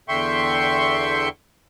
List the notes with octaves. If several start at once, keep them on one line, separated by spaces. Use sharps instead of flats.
E2 D3 E5 G5 C6 C#6